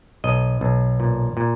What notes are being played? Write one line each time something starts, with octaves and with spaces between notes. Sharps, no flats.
B1 D#5
B1
A#2
A#2